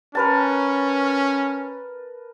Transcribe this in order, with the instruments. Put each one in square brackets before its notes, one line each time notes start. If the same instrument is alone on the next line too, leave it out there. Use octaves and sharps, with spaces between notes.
[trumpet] C#4 [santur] A#4 B4 A5